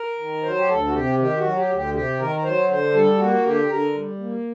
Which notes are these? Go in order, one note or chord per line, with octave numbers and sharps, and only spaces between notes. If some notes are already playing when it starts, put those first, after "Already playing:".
Already playing: A#4
D#3
F#3 C5
G4
D2 A4
F#4
C3 G4
D#3 G4
F#4
F#3
G4
D2
G4
C3 G4
D#3 A#4
A#4
F#3 C5
D3 C5
G3 A4
A#3 F#4
D3 G4
D3 A#4
G3
A#3